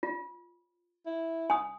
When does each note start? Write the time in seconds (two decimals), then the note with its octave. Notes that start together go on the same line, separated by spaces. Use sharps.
0.03 F4
1.06 E4
1.50 G#5 D#6